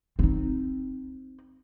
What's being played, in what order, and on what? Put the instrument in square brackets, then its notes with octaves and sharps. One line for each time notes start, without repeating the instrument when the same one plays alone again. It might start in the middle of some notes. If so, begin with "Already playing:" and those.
[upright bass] C4 D#4